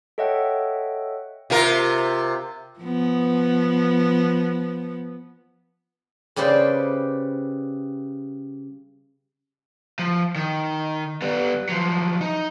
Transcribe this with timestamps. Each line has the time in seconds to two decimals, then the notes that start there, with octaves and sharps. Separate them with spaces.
0.18 A4 C#5 D#5 E5 F#5 G5
1.50 C3 F4 A#4
2.80 F3 B3
6.36 C#3 G3 G4 B4 C5 D5
9.99 F3
10.36 D#3
11.22 G3 B3
11.69 F3 F#3
12.21 D#4